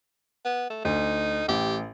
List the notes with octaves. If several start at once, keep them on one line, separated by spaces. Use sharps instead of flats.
B3
A3
D2 D#4
A1 G4